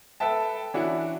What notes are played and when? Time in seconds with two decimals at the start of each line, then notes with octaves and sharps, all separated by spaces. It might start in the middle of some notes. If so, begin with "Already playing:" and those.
0.20 A4 B4 E5 G5 A5
0.74 E3 C#4 D4 E4 F#4